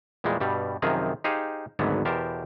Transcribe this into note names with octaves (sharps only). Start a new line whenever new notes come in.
E2 A#2 G3 G#3
G2 B2 G3
F#2 C3 D#3 F3 G#4 A#5
D#4 G4 G#4 C5 F5
G#1 D2 G#2 D3 F#3 B3
E2 B2 G4 A#4 C5 A5